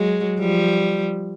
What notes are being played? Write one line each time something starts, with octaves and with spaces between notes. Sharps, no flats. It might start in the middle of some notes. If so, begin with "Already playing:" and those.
Already playing: F#3 G#3
F3 G3